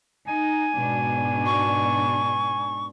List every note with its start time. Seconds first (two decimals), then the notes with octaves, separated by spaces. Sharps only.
0.28 D#4 G#5
0.74 G#2 B2 D4
1.46 C#6